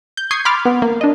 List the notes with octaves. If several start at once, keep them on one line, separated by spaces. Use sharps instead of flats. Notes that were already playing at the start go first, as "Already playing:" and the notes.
G6
C#6 D#6 G6 G#6 C7
B5 C6 D6 F6 A6
B3
A#3
D4 D#5